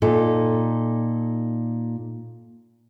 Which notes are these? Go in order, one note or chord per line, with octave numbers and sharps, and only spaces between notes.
A#2 D#4 A4